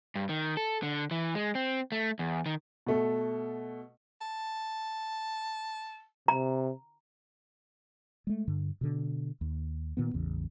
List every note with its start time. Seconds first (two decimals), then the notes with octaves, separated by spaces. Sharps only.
0.15 G2
0.29 D#3
0.57 A4
0.83 D3
1.11 E3
1.35 G#3
1.55 C4
1.92 A3
2.19 E2
2.46 D#3
2.86 B2 A3 A4
4.21 A5
6.28 C3 A#5
8.27 G#3 A3
8.48 G2 D3
8.81 B2 D3
9.41 D#2
9.97 A#2 D#3 B3
10.14 A1 E2 C#3